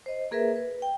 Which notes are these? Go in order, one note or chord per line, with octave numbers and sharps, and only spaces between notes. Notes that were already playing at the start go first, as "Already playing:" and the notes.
C5 D#5
A#3 G#4 A#4 B4 E5
B4
G5